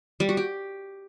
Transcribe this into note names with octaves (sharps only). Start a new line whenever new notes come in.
G3
F#4
G4